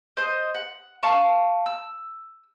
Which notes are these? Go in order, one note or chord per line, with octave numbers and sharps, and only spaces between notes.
C5 D#5
F#5
F5 A5 C#6
E6